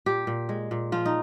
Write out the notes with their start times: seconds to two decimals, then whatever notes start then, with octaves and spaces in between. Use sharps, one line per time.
0.06 A#2 G4
0.27 A#2
0.49 G#3
0.71 A#2
0.92 F3 F4
1.05 D#4